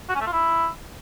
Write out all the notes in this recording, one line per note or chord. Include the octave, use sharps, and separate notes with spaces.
F#4
C#4
A3
F4
E4